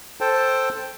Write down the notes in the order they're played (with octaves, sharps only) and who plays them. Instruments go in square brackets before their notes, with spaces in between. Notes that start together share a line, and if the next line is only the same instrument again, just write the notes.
[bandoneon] A4 C5 G5 A5